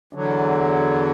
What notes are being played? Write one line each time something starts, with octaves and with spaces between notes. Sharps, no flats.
E2 D3 F#3